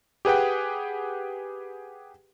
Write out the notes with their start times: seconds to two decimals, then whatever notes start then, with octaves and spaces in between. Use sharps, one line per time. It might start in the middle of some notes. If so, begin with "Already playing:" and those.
0.25 G4 G#4 B4 F#5 G5